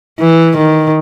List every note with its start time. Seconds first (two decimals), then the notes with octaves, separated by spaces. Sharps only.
0.20 E3
0.57 D#3